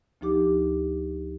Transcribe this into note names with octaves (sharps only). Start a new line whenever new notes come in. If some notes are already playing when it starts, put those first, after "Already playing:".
D2 F3 D#4 G4 D6